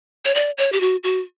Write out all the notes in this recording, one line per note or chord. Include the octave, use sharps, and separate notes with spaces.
C#5
D5
C#5
G4
F#4
F#4